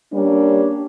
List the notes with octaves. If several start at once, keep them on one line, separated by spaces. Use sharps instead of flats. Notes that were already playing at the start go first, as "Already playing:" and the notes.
G3 A#3 C#4 D4